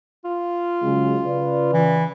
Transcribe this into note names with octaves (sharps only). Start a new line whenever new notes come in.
F4
C#3 F#3 G#3
C#3 B4 D5
E3